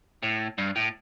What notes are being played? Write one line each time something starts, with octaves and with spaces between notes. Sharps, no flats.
A2
G2
A2